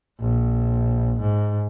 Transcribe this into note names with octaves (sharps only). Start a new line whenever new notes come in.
A#1
G#2